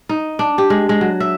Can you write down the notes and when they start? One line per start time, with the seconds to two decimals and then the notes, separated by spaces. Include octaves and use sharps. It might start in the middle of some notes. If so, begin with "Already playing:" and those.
0.09 D#4
0.39 D4
0.58 G4
0.70 G#3
0.89 G#3
1.01 F#3
1.20 E5